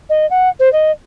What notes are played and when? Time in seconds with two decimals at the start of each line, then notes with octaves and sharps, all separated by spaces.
0.10 D#5
0.30 F#5
0.59 C5
0.73 D#5